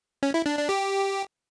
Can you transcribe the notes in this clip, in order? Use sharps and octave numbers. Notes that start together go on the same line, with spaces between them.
C#4
E4
D4
D4
G4